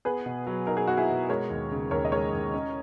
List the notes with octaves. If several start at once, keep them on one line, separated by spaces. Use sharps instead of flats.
B3 G#4 B4
B2
F#3
D#4 A#4
G#4
B3 F#4
E4 G#4
B2
G#3 A#4 C#5
D#2
C#3
D#2 A#4 C#5
D#5
G#3 A#4 C#5
D#2
C#4